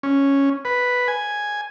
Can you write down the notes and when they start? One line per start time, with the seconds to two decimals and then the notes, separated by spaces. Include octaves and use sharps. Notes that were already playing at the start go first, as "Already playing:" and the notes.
0.03 C#4
0.65 B4
1.08 G#5